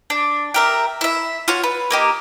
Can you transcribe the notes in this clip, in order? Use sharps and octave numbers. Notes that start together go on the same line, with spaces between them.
D4
G4 A#4 E5
E4 E5
F4 F#4 C#5
B4
A#3 D#4 G4